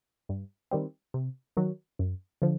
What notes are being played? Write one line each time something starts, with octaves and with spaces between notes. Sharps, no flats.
G2
D#3 G3 C4
C3
D#3 F#3
F#2
D3 F3